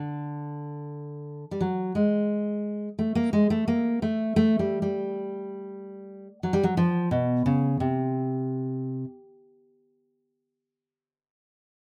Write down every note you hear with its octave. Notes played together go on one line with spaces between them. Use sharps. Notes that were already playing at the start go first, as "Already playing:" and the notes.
Already playing: D3
G3
F#3
G#3
A3
A#3
G#3
A3
A#3
A3
A3
G3
G3
F#3
G3
F#3
F3
B2
C#3
C3